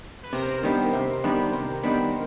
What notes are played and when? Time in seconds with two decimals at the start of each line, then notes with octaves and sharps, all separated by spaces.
0.23 B4
0.33 C3 A#4 C5
0.63 D#3 G3 B3 D4
0.93 C3
1.24 D#3 G3 B3 D4
1.53 C3
1.84 D#3 G3 B3 D4